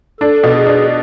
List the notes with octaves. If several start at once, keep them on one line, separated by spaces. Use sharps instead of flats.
D4 A4
B2
G#4
D4